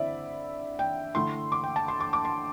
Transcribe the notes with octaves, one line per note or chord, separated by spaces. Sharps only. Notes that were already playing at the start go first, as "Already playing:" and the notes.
Already playing: D3 C4 E4 D5 E5
G5
D3 A3 E4 C6
D6
G5
A5
C6
D6
D6
C6